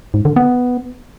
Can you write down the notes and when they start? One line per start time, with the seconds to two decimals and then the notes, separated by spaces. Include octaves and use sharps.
0.14 G#2
0.25 D3
0.36 B3